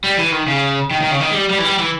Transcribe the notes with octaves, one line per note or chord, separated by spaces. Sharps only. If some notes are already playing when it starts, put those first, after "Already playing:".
G3
E3
D#3
C#3
D#3
D#3
C#3
D#3
G#3
G3
G3
E3
G3
E3